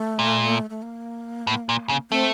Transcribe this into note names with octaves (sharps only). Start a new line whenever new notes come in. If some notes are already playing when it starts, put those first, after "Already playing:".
Already playing: A3
A#2
A3
A#3
A2
A#2
C#3
A3 C4